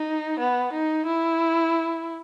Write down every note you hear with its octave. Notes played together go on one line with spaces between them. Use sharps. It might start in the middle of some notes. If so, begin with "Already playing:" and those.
Already playing: D#4
B3
D#4
E4